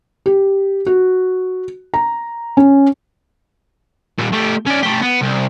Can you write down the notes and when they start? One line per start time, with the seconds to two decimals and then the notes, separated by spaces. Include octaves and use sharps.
0.26 G4
0.86 F#4
1.94 A#5
2.57 C#4
4.19 A#2 G3
4.33 A3 G4
4.67 C#4 D5
4.83 A3 G4
5.02 B3
5.22 C2